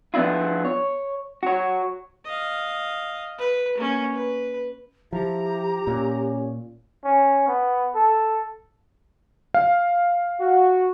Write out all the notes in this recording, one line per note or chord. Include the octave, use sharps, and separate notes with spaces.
F3 B3 D4 E4 F4
C#5
F#4 C#5
D#5 F5
B4
A#3 C#4
B4
F3 E4 G4 A#5
A#2 C#4
C#4
B3
A4
F5
F#4